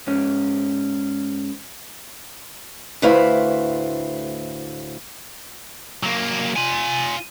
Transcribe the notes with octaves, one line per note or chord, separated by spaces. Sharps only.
G#2 C#4
D2 A2 E4 B4 C5 F5
F#3 A#3
F4 G#5